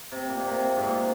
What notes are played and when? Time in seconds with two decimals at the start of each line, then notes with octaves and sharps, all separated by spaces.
0.12 C3
0.29 A#2
0.40 A#2
0.48 C3
0.76 G#2
0.83 A#2